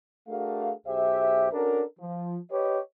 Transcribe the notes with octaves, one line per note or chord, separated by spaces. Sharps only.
A3 D4 F#4 G#4 A#4 F5
B1 G4 G#4 C5 E5
C#4 D4 F#4 A4 A#4
F3
G4 B4 C#5 D#5